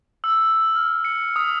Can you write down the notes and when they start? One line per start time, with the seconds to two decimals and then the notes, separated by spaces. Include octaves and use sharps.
0.24 E6
0.75 F6
1.05 C#7
1.36 D#6